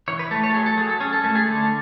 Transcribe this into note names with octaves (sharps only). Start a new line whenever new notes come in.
E3 C#5
B4
A3 A4
C#5
A4
F#3 G#4
A4
F#3 G#4
A4
C#4 G#4
A4
A3 A4
G#4
D3 A4